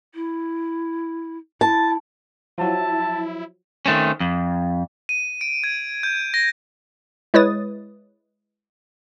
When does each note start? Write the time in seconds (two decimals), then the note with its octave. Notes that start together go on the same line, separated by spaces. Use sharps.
0.15 E4
1.61 E4 A5
2.58 F3 F#3 E4 E5 A5
3.86 D#3 A3 C4 C#4
4.20 F2
5.09 D#7
5.41 D7
5.64 G#6
6.03 G6
6.34 A#6
7.34 G#3 E4 B4 C#5 D#6 A6